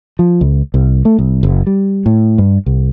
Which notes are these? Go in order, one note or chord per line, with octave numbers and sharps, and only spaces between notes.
F3
C#2
C2
A3
C2
F#1
G3
A2
G2
C2